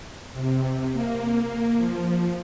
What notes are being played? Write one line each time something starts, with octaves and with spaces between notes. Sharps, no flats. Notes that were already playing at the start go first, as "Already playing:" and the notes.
C3
A#3
F3